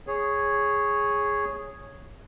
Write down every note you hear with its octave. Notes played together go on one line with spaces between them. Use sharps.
G#4 C#5